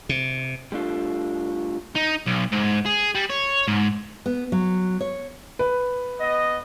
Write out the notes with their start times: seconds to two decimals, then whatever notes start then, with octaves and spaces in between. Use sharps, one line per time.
0.09 C3
0.72 G3 A3 D4 F4
1.95 D#4
2.26 B1
2.52 G#2
2.86 G#4
3.15 G3
3.30 C#5
3.68 G#2
4.26 B3
4.52 F#3
5.01 C#5
5.59 B4
6.20 B3 D#5